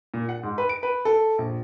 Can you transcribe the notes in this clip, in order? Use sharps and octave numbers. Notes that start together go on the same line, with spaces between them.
A#2
F#5
G#2
B4
D7
B4
A4
A#1